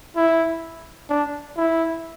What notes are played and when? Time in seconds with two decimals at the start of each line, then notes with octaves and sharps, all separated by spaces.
0.16 E4
1.10 D4
1.57 E4